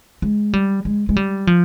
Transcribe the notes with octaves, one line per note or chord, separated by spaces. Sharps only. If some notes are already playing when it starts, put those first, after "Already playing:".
G#3
G3
G#3
G#3
G3
F3